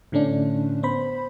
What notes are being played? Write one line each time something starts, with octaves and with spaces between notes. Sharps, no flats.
A2 D3 A3 C#4 D4
B3 C5 B5